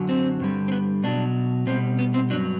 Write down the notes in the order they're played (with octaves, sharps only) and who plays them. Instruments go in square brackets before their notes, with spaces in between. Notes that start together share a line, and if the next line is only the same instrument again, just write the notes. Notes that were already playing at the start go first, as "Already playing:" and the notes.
Already playing: [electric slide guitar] F#2 D3 F#3
C4
G2 D3 G3
C4
B3
B2 F#3 D4
B2 G3 C4
B3
C4
G2 F#3 D4